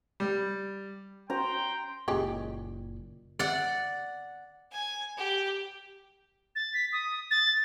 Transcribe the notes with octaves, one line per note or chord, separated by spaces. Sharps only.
G3
C#4 F#4 C5 G5 A#5 C6
F#1 A#2 G#3 C#4 G4
D5 F#5
G#5
G4
A6
B6
D#6
A6